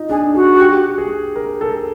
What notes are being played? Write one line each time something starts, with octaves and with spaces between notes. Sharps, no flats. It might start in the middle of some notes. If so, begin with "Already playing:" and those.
Already playing: D#4 F4
D4 G#4
F#4 G#4
G4
G#4
A#4
A4